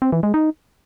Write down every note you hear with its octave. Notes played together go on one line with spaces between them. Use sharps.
C4
E3
G#3
D#4